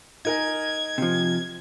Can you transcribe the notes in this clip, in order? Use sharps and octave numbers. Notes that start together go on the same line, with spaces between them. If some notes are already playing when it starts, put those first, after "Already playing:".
D#4 A#4 G#5 G#6
C3 F3